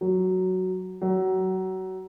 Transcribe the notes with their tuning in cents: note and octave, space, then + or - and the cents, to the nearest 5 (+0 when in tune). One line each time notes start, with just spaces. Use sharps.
F#3 +5
F#3 +25